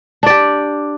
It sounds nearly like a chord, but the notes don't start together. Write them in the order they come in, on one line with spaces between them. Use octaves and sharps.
D4 D5 G4